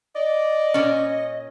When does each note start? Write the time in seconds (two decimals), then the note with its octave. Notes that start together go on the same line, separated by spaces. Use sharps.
0.16 D5 D#5
0.74 A#2 C#4